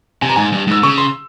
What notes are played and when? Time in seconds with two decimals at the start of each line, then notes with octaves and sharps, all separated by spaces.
0.22 C3 G#5
0.29 A#5
0.36 G#2 G#5
0.52 G2
0.67 G#2 E6
0.83 C#3 C#6
0.98 C6